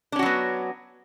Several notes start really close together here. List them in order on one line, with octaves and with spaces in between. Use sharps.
D4 C#4 F#4 F#3 B3